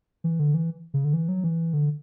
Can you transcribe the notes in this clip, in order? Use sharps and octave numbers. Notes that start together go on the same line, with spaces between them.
E3
D3
E3
C#3
D3
E3
F#3
E3
D3